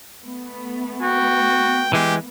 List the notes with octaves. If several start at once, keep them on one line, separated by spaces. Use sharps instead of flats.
A3 B3
F#4 G5
E3 G#3 G4